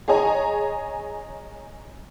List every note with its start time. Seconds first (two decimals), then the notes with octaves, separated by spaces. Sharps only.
0.08 G#4 C#5 D#5 G#5 A#5